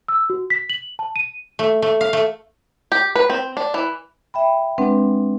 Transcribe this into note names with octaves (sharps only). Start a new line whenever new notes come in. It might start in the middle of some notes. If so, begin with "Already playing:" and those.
E6
F#4
B6
F#7
A5
D#7
A3
A3
F5
A3
G4
B4
C4
D4
E3
E5 G5 B5
G#3 C4 D4 B4 F#5